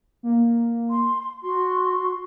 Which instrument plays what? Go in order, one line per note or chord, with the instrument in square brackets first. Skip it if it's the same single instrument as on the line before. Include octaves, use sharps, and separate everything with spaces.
[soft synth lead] A#3
[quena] C6
[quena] F#4 [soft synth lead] C6